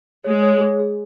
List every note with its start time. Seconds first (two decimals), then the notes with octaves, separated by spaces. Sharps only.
0.24 G#3 C#5
0.43 C#5
0.61 G#4
0.80 G#4